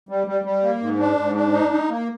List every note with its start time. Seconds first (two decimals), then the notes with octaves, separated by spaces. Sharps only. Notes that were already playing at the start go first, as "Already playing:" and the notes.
0.09 G3
0.27 G3
0.45 G3
0.63 A#3
0.81 G#2
0.99 D4
1.17 G#2
1.35 D4
1.53 D#4
1.71 D#4
1.89 A#3